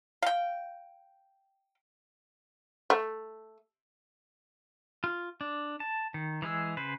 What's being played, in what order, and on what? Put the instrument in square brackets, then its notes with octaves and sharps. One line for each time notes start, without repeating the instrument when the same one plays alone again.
[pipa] F5 G5
[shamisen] A3
[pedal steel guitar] F4
D4
A5
D#3
E3 G#3 G#4 E6
C#3 B4 C5